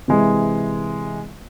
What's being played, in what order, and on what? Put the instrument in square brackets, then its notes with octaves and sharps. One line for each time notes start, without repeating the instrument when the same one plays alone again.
[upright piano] C3 E3 G#3